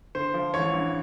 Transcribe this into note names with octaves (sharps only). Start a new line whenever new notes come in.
D3 C5
F3
A1 C#5
G2